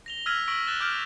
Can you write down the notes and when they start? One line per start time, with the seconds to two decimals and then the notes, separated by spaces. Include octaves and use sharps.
0.06 A#6 F7 G7
0.26 E6 F6 G#6 A#6 B6 D#7
0.48 C#6 E6 A#6 B6 D7 F#7
0.66 F#6 A6 E7 G7
0.80 D6 F6 G6 D7 F7